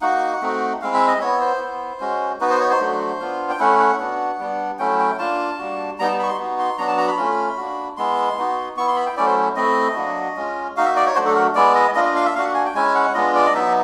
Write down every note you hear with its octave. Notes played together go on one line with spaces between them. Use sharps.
A#3 D#4 F#4 F#5
A3 C4 D#4 F#4
G#3 C4 E4 F5
E5
D#5
B3 E4 C#5
C5
B3 E4
G#3 C#4 F#4
B3 D#4 F#4 B4
C5
C#5
C5
F#3 A3 D4 F#4
B3 D4 F4
G5
A3 C#4 E4 F#5
F#5
B3 D4 F#4 F#5
G3 B3 D4
F#3 A3 C#4 E4 G5
G5
A#3 D4 F4 A5
G3 A#3 D4 F#4
G3 B3 D#4 A#5
A5
B5
C#6
C6
B3 D#4 F#4
C6
F#3 B3 D4 F#4 A#5
A5
A#5
B5
A3 C#4 F4
A#3 D4 F#4
G#3 B3 E4 C6
B3 D#4 F#4
B3 E4 C#6
C6
B5
G5
F#3 A3 C#4 E4 D5
C5
A3 C4 E4 D#5
F#3 A#3 D4 F#4
G#3 C#4 F4
A#3 D#4 F#4 F5
E5
D5
C#5
F#3 A3 D4 F#4 C5
A4
A#4
G#3 B3 E4 D5
D#5
A#3 D4 F4 D#5
D#5
F5
E5
A#3 D4 F#4 F5
F#5
G#5
G5
G#3 C#4 E4 G#5
F#5
G#3 B3 D4 F4 D#5
D5
D#5
F#3 B3 D#4 E5